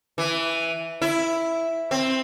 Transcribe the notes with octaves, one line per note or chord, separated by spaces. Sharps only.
E3
E4
C4